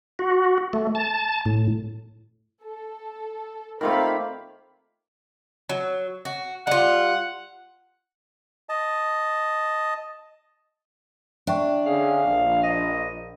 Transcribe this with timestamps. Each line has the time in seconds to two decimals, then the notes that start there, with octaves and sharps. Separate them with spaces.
0.19 F#4
0.73 A3
0.95 A5
1.45 A2
2.64 A4
3.81 D#3 A3 A#3 C4 F4 A#4 F5 B5
5.69 F#3
6.25 F#4
6.67 G3 F4 F#5
8.69 D#5 A5
11.47 D4 E5 G5 C#6
11.86 D3 C#4 G#4 F5
12.25 A#1
12.63 D#5